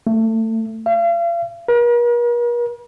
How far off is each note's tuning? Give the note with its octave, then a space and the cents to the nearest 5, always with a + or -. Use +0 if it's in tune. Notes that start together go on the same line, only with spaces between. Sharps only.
A3 +25
F5 -40
A#4 +45